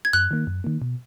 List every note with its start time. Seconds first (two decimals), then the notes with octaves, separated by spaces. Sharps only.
0.05 G#6
0.13 F#2 F#6
0.31 D#3 A#3
0.47 F#2
0.64 D#3 A#3
0.82 B2